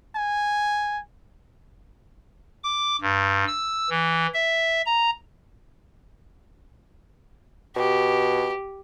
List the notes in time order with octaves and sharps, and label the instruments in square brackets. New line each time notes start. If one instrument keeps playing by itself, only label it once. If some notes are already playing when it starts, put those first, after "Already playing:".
[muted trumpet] G#5
[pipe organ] D6
G2
E6
E3
E5
A#5
[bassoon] B2 [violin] G4